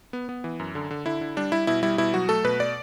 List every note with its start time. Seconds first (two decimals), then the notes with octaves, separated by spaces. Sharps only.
0.13 B3
0.29 B3
0.44 E3
0.60 F#2
0.75 D3
0.91 D3
1.06 D3 E4
1.21 D3
1.37 G3 D4
1.52 G3 E4
1.67 B2 E4
1.83 G3 E4
1.98 B2 E4
2.14 F#3 F#4
2.29 A3 A4
2.45 B2 B4
2.60 D5